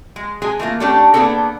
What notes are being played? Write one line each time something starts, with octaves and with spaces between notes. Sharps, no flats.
G#3
G#3 G#4 G#5
E3 A3 A#3 F4
A3 C#4 D4 G4 A4
A#3 B3 D4 D#4 G#4 A4